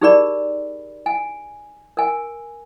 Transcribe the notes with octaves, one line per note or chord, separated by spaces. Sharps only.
D#4 G4 G#4 A#4 D5 B5
G#5
A#4 G#5